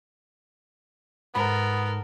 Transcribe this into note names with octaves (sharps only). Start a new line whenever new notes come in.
G#2 B3 A4 A#4 B5